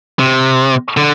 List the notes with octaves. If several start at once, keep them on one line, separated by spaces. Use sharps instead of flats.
C3
D3